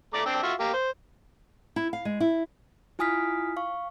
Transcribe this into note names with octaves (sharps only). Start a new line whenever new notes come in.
A3 D5 A#5
C4 D4
F4 F#4 E5
A#3 G4
C5
E4
F5
G#3
E4
E4 F4 G#5 D#6 F6 B6
F5 C#6